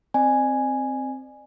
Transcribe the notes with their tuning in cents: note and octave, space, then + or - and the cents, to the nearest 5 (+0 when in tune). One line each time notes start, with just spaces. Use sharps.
C4 +0 D5 +40 G#5 +0